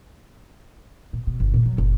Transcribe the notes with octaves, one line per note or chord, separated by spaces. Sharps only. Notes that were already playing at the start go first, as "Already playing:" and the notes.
A#2
B2
G1
E2 A#2
F#3
F#1